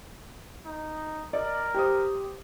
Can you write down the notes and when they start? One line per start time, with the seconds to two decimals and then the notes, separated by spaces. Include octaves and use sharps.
0.66 D#4
1.33 A#4 D5 D#5
1.74 G4 C5 D#6